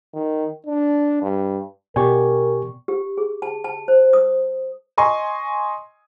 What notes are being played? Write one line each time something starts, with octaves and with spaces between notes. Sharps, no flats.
D#3
D4
G2
B2 G4 A#4 D5 G5 G#5 C#6
G4
G#4
A5
A5
C5
D#6
D#5 G#5 C6 C#6